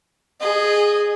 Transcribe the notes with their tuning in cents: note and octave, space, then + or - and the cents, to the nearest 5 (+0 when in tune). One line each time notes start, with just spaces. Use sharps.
G#4 +0 D#5 -25